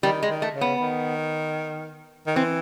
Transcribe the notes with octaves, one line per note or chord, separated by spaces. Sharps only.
D#3 G3
G#3
D#3
A3
C#3
B3
D#3
D#3
E3 C4